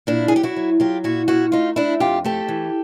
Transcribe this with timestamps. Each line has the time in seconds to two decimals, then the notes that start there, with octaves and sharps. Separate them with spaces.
0.07 A#2 D4 E4
0.28 G#4
0.32 F#3 G4
0.43 E4 F#4
0.56 F#3
0.80 F#3 F4 G4
1.04 A#2 E4 F#4
1.28 A#2 E4 F#4
1.52 A3 D#4 F4
1.76 A3 D4 E4
2.00 F2 F4 G4
2.24 A3 G4 A4
2.48 E3